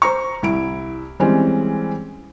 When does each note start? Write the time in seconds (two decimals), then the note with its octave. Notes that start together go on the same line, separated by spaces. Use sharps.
0.02 C5 A#5 C#6
0.42 C2 E4 D7
1.20 E3 G3 G#3 C4 C#4